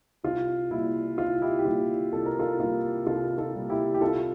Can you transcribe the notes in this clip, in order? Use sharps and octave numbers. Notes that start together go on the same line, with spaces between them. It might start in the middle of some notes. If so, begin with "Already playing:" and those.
C2 F4
A#2 G3 E4
C2 F4
E4 G4
G4
A#2 G3 F4
C2 A4
A#4
F4 A4
A#2 G3 F4
C2 F4 A4
F4 A4
A#2 G3
E4 G4
G4
C2 F4 A4